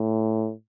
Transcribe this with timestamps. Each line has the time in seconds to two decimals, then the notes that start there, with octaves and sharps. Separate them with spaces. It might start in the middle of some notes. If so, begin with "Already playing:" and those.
Already playing: A2